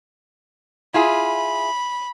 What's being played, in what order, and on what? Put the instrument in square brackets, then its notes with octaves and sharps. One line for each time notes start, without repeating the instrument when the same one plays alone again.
[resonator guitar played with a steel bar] E4 F4 G#4 [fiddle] B5